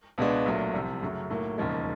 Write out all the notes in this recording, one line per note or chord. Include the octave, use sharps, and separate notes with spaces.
C#2 B2 G#3 B3 D4
A#1 A#2 F#3 A3
C2 C3 F3
F#2 C#3 F#3 A3 C#4
B1 A2 F#3 A#3
E1 D#2 C#3 F3 G#3